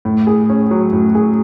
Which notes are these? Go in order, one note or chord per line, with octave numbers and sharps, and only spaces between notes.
A2
G#4
C#4
F#3
A2
G#4